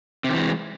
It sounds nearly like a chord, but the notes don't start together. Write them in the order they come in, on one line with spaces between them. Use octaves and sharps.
C3 D#3 E3 G#3